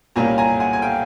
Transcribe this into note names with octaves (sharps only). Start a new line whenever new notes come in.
C2 A#2 G3 A#3 C#4 G#5 A#5
G#5 A#5
F#5 G#5
G#5
F5 G5